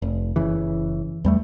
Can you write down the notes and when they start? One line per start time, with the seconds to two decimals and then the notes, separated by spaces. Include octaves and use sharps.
0.02 F1
0.36 F#1 C#3 E3
1.24 E2 G3 A3